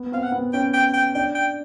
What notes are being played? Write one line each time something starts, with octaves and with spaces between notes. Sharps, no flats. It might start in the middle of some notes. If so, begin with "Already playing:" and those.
Already playing: B3
C4 F5
F#5
B3
C#4 G5
G5
G5
D4 G5
G5